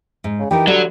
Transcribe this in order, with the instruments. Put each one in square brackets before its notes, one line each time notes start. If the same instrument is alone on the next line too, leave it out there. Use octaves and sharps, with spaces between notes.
[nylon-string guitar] G#2
[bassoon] C#3
[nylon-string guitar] E3 D#4 A#4 [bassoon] G4
[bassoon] D3 [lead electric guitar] F#3 [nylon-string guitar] G3